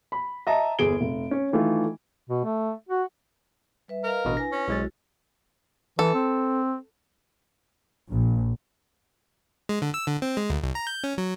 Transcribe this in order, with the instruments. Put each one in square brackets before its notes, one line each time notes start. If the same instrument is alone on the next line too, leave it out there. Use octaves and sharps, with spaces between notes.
[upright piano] B5
D#5 E5 A5 A#5
G1 E2 G#4 D7 G7
F1
C#4
D#3 E3 A3 F4
[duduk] B2
A3
F#4
[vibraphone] G3 B4 E5
[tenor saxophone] A#4 [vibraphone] B4 D#5 F5
[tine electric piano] A1 B2 D#5 [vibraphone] D4
[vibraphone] E4 B4 G#5 [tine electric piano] A#6
[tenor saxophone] C#4
[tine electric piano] B1 G#3 A6 [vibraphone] E4 F#4
[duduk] E3 [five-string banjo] A4
[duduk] C4
[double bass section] A#1
[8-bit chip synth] G#3
D3
E6
D3
C4
G#3
D2
C2
A#5
G6
C#4
F#3